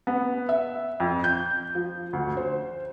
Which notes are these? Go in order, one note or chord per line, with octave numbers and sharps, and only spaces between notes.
B3
E5
F2
G6
F3
D2
C5